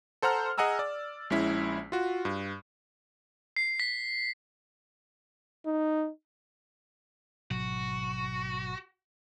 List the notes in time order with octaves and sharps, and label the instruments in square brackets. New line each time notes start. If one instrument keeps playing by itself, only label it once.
[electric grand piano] A4 C5 F#5 A#5 F6
G#4 D#5 F#5 G#5 A#5 E6
D5
A#1 G#3 C#4 E4 B6
F4 F#4
G2
[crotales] C7
B6
[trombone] D#4
[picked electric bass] G#1 B2 F#3 [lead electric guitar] F#4